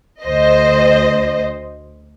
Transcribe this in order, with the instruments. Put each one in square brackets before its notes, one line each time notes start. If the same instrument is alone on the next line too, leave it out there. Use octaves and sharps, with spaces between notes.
[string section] D2 C5 D#5